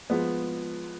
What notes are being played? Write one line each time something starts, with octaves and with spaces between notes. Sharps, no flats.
F3 G#3 B3